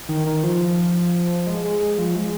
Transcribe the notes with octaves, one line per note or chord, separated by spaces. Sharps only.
D#3
D#3
F3
G#3
G#3
G#3
F3
G#3